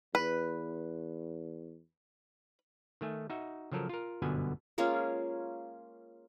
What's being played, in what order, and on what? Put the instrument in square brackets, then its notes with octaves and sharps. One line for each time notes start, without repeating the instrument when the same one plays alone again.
[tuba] E2 [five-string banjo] B4
[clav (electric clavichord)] D#3 A3 G#5
D#4 F#4 E5
C#3 F3 F#3 A4 A#4
F4 A#4
G1 F#2 B2 D3 B3 G#5
[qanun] G#3 A#3 C#4 F4